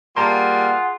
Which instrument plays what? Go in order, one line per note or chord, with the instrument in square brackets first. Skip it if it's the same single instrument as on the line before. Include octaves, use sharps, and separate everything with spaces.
[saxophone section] G3 A#3 [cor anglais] F4 [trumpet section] G#4 F#5 [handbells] A5 A#5 C6